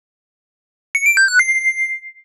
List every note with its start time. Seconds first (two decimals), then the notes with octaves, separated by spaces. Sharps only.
0.95 C#7
1.06 D7
1.17 G6
1.28 F#6
1.39 C7